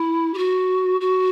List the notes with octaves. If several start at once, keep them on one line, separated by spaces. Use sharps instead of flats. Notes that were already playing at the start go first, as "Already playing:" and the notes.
Already playing: E4
G4
F#4
F#4